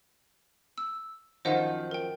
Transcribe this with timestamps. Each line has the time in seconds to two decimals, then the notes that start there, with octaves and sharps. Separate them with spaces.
0.78 E6
1.45 F#2 D#3 F3 C5 D#5 F#5
1.91 A#4 G5